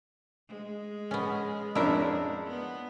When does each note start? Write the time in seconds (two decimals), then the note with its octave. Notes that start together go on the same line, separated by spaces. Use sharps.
0.49 G#3
1.11 B3 C#4
1.75 F2 C#4 D4 E4 A#4
2.46 B3